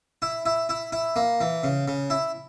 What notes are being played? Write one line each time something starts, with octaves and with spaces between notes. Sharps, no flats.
E4
E4
E4
E4
A#3
E3
C#3
C#3
E4